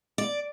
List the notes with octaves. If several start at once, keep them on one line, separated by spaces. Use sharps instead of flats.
D5